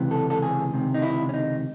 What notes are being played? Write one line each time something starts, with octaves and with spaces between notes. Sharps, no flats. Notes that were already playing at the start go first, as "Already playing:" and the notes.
Already playing: C#2 C3 E3
A4
A4
G#4
C#2 C3 D#3
D#4
E4
C#4
D#4